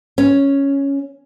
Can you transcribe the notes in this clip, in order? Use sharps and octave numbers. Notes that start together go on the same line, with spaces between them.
C#4